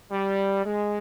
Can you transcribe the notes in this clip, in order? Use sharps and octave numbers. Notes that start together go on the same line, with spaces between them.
G3
G#3